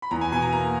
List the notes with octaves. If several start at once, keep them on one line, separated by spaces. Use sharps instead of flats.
B5
E2 A#5
G#5
B2 G#5
A#5
A#3 A#5